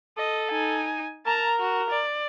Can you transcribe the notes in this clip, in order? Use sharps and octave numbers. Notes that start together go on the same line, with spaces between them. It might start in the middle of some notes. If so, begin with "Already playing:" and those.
A4 D#5
D#4 G#5
A#4 A5 A#5
F#4
D5